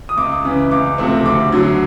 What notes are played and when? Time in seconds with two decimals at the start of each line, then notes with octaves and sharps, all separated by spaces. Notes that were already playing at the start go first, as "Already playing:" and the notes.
0.09 D#6
0.17 C#2 D6
0.45 C#3 E3
0.71 C#2 D6
0.98 C3 F3 A3 C4
1.25 D2 D6
1.52 D3 F#3